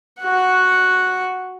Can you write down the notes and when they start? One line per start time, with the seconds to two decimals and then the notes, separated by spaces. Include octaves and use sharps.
0.22 F#4 F#5